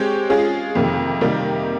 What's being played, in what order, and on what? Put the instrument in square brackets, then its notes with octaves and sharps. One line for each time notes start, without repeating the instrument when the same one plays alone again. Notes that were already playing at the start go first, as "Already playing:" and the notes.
Already playing: [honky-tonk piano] G#3 C4 G4 C#5
G#3 C#4 F4 G#4
F2 C3 D#3 A#3
C3 D#3 G3 A#3 D#4